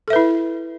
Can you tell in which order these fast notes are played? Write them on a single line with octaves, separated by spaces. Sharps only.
A4 E5 B4 E4